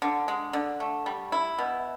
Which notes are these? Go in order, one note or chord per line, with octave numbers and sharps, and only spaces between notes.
D3
G#3
D3
A3
G3
E4
B2